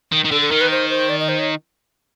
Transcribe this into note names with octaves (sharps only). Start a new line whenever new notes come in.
D#3
D#3
D3 A4
A4
D#3 A#4
B4
C5
C5
D5
D#5
C5
C#5